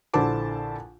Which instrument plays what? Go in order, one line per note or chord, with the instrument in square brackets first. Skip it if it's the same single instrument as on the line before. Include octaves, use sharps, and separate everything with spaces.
[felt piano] A#1 D3 E4 C5 A5 D6